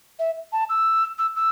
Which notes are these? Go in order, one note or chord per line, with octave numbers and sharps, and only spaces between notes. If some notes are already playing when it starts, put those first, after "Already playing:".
E5
A5
E6
E6
E6